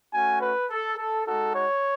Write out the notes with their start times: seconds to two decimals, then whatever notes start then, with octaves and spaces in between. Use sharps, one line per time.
0.13 A3 C#4 F#4 G#5
0.41 B4
0.70 A4
0.97 A4
1.27 G#3 D#4 F#4 A4
1.54 C#5